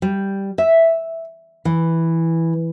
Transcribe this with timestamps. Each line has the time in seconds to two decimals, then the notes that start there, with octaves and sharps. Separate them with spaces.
0.02 G3
0.58 E5
1.65 E3